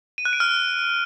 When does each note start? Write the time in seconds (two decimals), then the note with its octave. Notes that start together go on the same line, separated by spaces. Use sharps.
0.18 D#7
0.25 F#6
0.33 D7
0.40 F6